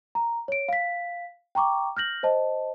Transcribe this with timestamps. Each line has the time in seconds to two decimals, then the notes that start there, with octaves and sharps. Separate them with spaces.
0.15 A#5
0.48 C#5 D7
0.68 F5 B6
1.55 G5 A#5 C#6 D6
1.97 F6 G6 A#6 F#7
2.23 C5 D#5 A5